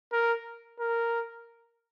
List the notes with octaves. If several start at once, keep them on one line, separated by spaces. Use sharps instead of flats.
A#4
A#4